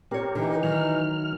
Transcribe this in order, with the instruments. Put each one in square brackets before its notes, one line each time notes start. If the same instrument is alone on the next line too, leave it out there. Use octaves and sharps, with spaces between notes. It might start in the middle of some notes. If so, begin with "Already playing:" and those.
[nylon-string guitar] C4 C#5 [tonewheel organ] G4 A#4
[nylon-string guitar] D3 [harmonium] E3 D#4
[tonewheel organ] D#3 F6 [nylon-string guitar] F#3